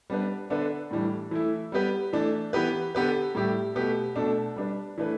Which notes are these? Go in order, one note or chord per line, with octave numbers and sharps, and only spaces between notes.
G3 B3 D4 B4
D3 B3 D4 B4
A2 E3 G3 D4
E3 A3 E4
G3 B3 G4 B4
E3 A3 D4
E3 B3 G4 B4
D3 B3 G4 B4
A2 G3 E4 G4
B2 A3 G4 B4
B2 A3 D4 A4
G3 D4 B4
E3 A3 D4 B4